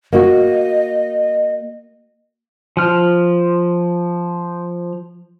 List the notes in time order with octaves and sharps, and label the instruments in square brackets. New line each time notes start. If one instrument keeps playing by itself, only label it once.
[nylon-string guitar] A#3 F#4 [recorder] D#5
[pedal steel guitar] F3 F6